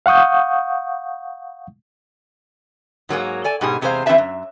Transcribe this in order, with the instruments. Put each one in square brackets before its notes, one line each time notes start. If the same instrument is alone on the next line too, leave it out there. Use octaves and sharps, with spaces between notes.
[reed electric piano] F5 F#5 C#6 D#6 G6
[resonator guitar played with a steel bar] G#2 F#3 A#3 G#4
A4 D5 G#5
G#2 B2 G4 G#4
E2 C3 G#3 C4 C5 F5
E3 C4 G4 B4 E5 A5
F#2